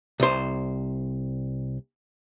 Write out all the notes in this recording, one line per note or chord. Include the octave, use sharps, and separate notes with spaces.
C2 C5